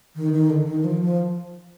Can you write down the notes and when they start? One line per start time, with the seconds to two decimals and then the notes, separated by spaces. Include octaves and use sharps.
0.16 D#3
0.33 D#3
0.50 D3
0.67 D#3
0.84 F3
1.02 F3